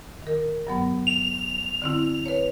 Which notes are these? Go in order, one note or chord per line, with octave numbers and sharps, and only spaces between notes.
D#3 A#4
G2 F#3 B3
F7
D3 C4 E4
B4 C#5